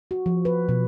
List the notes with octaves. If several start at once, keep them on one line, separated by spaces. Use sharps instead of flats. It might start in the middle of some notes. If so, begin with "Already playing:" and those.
F#4
F3
B4
B2